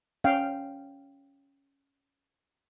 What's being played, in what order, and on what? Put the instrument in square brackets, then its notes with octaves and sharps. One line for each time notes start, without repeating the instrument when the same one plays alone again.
[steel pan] C#4 F5 G5